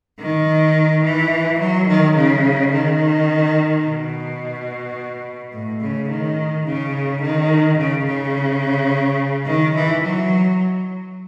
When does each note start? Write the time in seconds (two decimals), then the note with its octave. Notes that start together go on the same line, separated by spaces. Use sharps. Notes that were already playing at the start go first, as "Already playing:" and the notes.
0.20 D#3
1.04 E3
1.59 F#3
1.88 D#3
2.15 C#3
2.72 D#3
3.85 B2
5.53 A2
5.81 C#3
6.09 D#3
6.66 C#3
7.22 D#3
7.78 C#3
8.06 C#3
9.46 D#3
9.75 E3
10.03 F#3